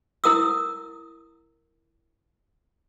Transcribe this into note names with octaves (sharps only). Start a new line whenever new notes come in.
E4 A#4 D#6 E6